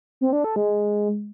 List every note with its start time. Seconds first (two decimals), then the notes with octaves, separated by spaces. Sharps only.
0.21 C4
0.33 D4
0.44 A4
0.56 G#3